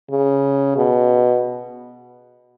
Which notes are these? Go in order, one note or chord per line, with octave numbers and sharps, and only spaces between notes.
C#3
B2